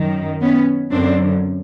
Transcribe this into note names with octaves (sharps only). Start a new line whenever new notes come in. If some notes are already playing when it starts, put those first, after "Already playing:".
Already playing: F#2 D#3
B3 C#4
F#2 D3 C4 D4